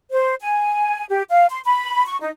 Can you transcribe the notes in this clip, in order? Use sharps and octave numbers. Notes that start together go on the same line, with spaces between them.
C5
G#5
G4
F5
C6
B5
C#6
D#4